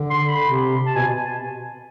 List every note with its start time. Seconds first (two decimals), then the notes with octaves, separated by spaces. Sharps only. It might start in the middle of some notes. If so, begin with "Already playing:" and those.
Already playing: D3
0.10 C6
0.29 B5
0.48 C3
0.86 A5
0.96 B2 G#5